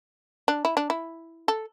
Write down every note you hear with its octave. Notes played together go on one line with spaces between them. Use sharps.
D4
E4
D4
E4
A4